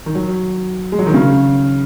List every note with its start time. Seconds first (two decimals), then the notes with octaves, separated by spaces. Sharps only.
0.06 D#3
0.15 F#3
0.92 G#3
0.99 F#3
1.06 D#3
1.14 C#3